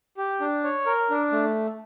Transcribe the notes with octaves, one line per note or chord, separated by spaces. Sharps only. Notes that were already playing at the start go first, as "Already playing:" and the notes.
G4
D4
C#5
A#4
D4
A3